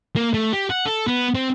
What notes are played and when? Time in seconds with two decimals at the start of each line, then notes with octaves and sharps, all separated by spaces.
0.16 A#3
0.34 A3
0.53 G4
0.70 F#5
0.86 A4
1.07 B3
1.35 C4